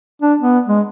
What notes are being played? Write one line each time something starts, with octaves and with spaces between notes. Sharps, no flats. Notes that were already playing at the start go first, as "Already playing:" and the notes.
D4
B3
G#3